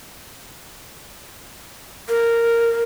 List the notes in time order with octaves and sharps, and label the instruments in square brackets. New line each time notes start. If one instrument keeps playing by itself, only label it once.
[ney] A#4